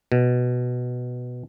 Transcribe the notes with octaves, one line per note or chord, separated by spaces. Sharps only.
B2